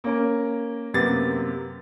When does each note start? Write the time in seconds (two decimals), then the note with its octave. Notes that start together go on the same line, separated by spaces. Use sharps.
0.04 A#3 C#4 A#4
0.94 F#2 C3 A#3 B3 G4 A6